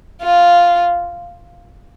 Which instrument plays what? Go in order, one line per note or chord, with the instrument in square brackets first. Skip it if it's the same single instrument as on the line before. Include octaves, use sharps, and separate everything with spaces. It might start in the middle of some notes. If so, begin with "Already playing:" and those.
[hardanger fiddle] F4